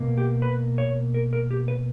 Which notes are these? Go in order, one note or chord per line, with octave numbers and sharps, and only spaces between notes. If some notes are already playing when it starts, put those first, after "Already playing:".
Already playing: B2 A#3
G4
B4
C#5
A#4
A#4
G4
B4